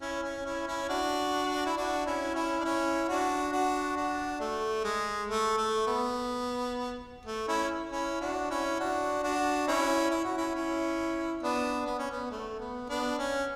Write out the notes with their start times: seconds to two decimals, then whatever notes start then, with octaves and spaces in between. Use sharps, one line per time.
0.01 C#4 E4
0.23 C#4
0.45 C#4 E4
0.67 C#4 E4
0.89 D4 F#4
1.66 E4
1.77 D4 F#4
2.06 C#4 E4
2.35 C#4 E4
2.60 D4
2.65 C#4 E4
3.08 D4 F#4
3.52 D4 F#4
3.96 D4 F#4
4.40 A3
4.84 G#3
5.28 A3
5.57 A3
5.87 B3
7.26 A3
7.47 C#4 E4
7.92 C#4 E4
8.21 D4 F#4
8.50 C#4 E4
8.80 D4 F#4
9.24 D4 F#4
9.67 C#4 E4
10.11 E4
10.24 F#4
10.37 C#4 E4
10.55 C#4 E4
11.43 B3 D4
11.86 B3
11.99 C#4
12.11 B3
12.31 A3
12.59 B3
12.89 B3 D4
13.19 C#4